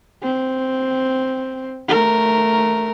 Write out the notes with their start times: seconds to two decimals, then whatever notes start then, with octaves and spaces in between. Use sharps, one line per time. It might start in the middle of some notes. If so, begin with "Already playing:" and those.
0.23 C4
1.88 A3 A#4